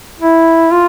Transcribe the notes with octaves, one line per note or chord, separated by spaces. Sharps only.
E4
F4